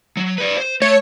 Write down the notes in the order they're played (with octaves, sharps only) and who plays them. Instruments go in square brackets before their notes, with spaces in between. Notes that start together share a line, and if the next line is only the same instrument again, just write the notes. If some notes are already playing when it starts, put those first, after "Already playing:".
[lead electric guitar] F#3
B4 D5
C5
[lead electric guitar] A3 [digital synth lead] C#5